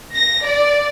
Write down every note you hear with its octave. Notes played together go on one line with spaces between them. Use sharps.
A#6
D5